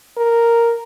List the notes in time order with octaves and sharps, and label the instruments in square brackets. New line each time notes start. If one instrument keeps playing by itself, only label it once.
[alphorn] A#4